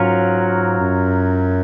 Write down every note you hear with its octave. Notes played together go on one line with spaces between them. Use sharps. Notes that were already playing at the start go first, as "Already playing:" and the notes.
Already playing: G#2 F#3 C#4 F4 A#4 C#5
F#2